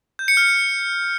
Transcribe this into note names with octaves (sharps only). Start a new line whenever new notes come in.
G6
C#7
F6